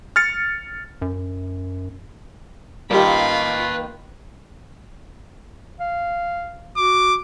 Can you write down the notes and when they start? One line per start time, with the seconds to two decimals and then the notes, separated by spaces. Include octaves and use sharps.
0.16 F6 A6 C#7
1.02 F#2
2.91 D#3 G3 A#3 F4 G4 B4 A5 B5
5.80 F5
6.77 F#4 D6